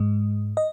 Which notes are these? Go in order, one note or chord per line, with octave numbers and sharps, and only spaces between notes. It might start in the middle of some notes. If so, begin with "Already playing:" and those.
Already playing: G#2 G#3
D#5